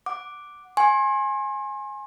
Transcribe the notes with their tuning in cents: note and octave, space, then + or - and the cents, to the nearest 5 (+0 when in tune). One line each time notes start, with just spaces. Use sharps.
F#5 +0 D6 +0
G#5 +0 C6 +40